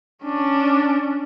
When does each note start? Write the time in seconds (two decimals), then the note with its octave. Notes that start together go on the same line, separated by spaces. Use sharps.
0.23 C#4 D4